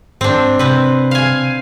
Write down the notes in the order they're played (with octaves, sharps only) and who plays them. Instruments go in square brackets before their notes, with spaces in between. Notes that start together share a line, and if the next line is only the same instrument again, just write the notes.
[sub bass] G#2 [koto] C4 D4
[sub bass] C3 [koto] C4 B4
[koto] F5 G#5